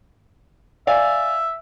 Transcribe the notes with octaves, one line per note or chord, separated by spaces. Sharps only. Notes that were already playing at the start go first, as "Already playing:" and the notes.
D5 E5 F5 G#5